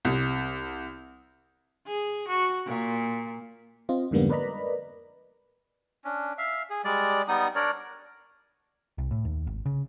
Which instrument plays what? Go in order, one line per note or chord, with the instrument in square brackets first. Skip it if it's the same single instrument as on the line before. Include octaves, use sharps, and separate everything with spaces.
[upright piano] C2
[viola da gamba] G#4
F#4
A#2
[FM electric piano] C4 F4 D#5
F2 G#2 D3 G3 A#3 B3
A#4 B4 D5 D#5 A#5 B5
[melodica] C#4 D4
E5 F5
G#4
G3 G#3 D5
G3 B3 D#4 D#6
D4 A#4 C#5 D5
[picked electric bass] C2
A2
D#2
G#1
C#3